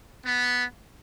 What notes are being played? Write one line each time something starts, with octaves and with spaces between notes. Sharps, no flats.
B3